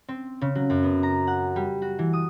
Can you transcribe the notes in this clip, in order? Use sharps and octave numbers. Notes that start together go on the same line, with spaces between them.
C4
C#3
F#3
F#2
B3
A#5
F#5
G3
F#4
E3
D#6